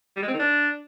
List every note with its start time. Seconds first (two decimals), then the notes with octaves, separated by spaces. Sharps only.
0.17 G3
0.22 G#3
0.28 C4
0.34 D#3
0.39 D4